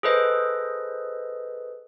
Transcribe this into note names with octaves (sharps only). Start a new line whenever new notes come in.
G#4 A4 B4 C5 D#5